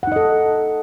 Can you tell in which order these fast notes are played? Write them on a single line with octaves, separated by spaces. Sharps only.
F#5 D#4 D#5 A4